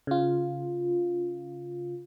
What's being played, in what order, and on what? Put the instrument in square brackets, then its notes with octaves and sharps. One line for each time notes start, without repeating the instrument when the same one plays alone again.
[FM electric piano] C#3 F4